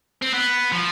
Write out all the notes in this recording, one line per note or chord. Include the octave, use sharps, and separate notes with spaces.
C4
B3
F3